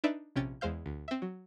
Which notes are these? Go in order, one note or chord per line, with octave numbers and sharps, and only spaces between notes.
D4 D#4 B4 D5 E5
A#1 C3 C#4 G5 G#6 A6
E2 G#3 C5 F5 G6
D2
C4 E5
F#3